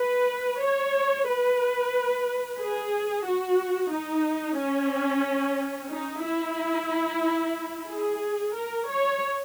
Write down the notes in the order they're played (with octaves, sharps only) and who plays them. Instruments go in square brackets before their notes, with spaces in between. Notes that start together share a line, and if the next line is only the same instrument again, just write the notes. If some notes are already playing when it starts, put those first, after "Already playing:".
Already playing: [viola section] B4
C#5
B4
G#4
F#4
D#4
C#4
D#4
E4
G#4
A#4
C#5